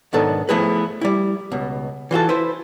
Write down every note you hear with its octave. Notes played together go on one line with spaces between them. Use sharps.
B1 G#2 D#3 B3 D4 A4
F3 A3 B3 E4 G#4 B4
G3 E4
C#2 B2
E3 F4 F#4 A4
E4 B4 C5